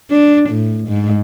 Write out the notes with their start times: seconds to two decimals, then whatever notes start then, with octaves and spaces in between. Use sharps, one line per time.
0.10 D4
0.50 A2
0.89 G#2